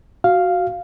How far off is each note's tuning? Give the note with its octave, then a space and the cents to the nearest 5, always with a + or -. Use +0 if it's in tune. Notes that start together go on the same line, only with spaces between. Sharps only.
F#4 +0 F5 +0